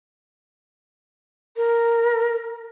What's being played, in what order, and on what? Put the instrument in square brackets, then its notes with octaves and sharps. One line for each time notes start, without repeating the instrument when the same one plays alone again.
[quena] A#4